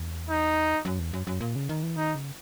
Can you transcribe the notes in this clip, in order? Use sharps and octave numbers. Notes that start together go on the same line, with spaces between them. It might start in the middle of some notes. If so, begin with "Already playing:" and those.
Already playing: E2
D#4
F#2
E2
F#2
F#2
A#2
C#3
D#3
E3
D#3 D#4
C#3